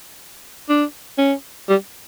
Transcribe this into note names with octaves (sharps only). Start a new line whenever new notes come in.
D4
C#4
G3